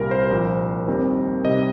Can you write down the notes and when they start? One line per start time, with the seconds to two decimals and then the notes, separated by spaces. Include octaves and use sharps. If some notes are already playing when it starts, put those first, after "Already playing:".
Already playing: C2 A#2 G3 A#4
0.11 C5
0.31 A#1 A#2 F3
0.88 D#2 D#3 G3 C4
1.44 C3 G3 D#5